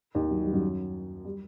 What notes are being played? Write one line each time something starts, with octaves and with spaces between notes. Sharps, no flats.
D#2 D#3
F#3
G3
F#2 F#3
G3